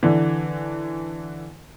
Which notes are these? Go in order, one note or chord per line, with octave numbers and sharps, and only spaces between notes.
D3 E3